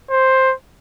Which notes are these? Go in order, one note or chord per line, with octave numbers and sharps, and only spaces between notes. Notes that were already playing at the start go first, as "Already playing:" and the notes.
C5